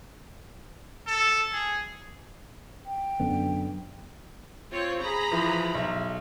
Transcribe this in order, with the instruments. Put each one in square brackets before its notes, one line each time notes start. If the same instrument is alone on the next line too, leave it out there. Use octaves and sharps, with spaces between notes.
[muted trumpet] A4
G#4
[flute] G5
[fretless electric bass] F#2 D3 B3
[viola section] C4 F4 C#5
G#4 A#5 B5
[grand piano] E3 F3
B1 E5